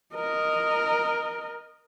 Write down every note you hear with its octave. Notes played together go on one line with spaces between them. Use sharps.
A#4 D#5